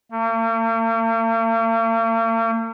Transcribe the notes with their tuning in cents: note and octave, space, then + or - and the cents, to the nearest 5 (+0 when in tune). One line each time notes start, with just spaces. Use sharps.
A#3 -45